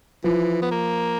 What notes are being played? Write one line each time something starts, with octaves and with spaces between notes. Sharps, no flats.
E3 F3
B3
A#3